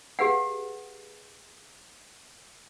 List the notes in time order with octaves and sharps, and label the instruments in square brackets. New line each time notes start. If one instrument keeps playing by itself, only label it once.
[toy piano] G4 G#4 B4 F5 F#5